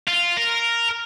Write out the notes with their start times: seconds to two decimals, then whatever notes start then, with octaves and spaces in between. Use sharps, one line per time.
0.08 F4
0.37 A#4